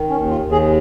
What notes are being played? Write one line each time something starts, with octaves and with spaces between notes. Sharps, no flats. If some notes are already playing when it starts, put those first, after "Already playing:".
Already playing: D#3
C#4
D#2
F4
D#2
G#4